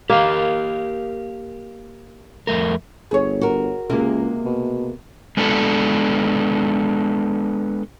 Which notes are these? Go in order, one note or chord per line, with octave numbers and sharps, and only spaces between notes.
A#3 G4 A#4 F5
F2 A3 A#4
G1 G#4 C#5
F#4 A#4
C#2 C3 G#3 A#3
B2
G#3 B3 D4 A4 B4